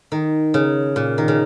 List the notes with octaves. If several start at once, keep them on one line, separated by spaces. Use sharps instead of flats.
D#3
C#3
A#2
D#3
C#3